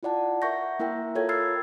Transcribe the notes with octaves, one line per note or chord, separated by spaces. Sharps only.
E4 F4 D5 F#5 A5
A#4 E5 F#5 C#6 G6 A#6
A#3 E4 A#4 E5 G5
F4 A4 A#4 C#5 G5 G#6
B5 E6 F6 G#6 A6 C7